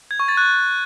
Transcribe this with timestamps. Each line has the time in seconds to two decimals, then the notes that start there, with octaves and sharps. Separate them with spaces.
0.11 G#6
0.20 C#6
0.28 A6
0.37 F#6